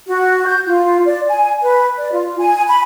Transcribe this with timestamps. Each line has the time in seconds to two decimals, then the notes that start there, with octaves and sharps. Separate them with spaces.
0.07 F#4
0.46 G6
0.66 F4
1.05 D5
1.28 G#5
1.62 B4
1.98 D5
2.12 F4
2.39 G#5
2.68 B5